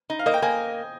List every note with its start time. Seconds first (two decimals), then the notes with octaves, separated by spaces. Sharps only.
0.10 D#4
0.19 F5
0.26 A#3 D#5
0.34 G5
0.42 A#3 G#5